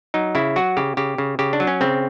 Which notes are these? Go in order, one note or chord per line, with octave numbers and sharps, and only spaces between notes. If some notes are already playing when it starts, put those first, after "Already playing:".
F#3 D#4
C#3 E4
F#3 F#4
C#3 G4
C#3 G4
C#3
C#3 G4
D4
F#3
C#4
C#3 C4